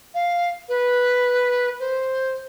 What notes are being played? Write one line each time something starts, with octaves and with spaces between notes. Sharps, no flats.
F5
B4
C5